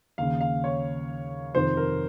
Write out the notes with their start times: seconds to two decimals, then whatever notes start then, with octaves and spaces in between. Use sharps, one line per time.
0.18 D#2 C#3 F5
0.41 F5
0.64 C#5
1.55 F2 C3 D#3 C5
1.77 A#4